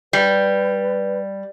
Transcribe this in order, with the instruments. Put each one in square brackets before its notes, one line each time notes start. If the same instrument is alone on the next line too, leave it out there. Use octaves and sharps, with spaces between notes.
[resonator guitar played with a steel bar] G3 [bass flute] B4